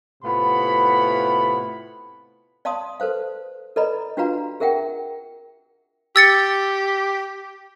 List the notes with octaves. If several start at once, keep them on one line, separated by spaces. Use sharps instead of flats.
A2 C3 B3 F4 F#5 B5
D5 F5 A5 C6 D#6
A4 B4 C5 F5
A4 B4 D5 D#5 A#5 B5
D4 F4 F#4 B4 F5 A#5
G#4 A#4 E5 F#5 G5
G4 E6 A6 C#7